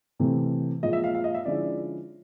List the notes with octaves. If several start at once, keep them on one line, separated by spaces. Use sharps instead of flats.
C3 E3 A3
A#2 F3 G#3 D#5
E5
F5
F5
D#5
E5
D3 F3 G#3 C#4 E4 D5